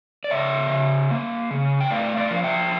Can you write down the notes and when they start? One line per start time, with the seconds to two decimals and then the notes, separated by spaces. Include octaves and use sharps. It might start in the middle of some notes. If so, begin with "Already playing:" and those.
0.24 D5
0.30 C#3 C#5 E5
0.70 C#3
1.11 A#3
1.51 C#3
1.80 G5
1.90 A3 D5 F5
2.17 D5 F5
2.31 F3
2.44 E5 G5